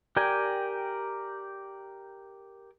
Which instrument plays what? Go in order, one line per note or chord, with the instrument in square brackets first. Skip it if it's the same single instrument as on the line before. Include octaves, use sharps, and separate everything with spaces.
[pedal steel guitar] G4 A#4 D5 G5 G#5